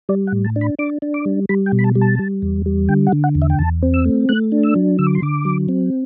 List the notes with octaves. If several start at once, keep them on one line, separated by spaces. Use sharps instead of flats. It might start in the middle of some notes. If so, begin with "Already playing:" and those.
G3 D5
F#5
A2
A5
D4
B5
D4 D6
D4
D6
G3
G3 B5
G5
B2
B5
A5
G3
A5
G3
E2
G3
D3 G5
F#5
D3
F#5
E2
E5
G5
E2 A5
C4
E6
A3
A3 F#6
D4
E6
F#3
D3 E6
D6
C6
D3 D6
F#3
C4